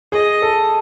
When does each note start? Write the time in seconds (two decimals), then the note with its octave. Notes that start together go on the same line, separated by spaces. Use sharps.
0.12 G#4 D#5
0.42 A4